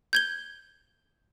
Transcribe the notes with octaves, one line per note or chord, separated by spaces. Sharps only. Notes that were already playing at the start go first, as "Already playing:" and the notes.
G6 G#6 G7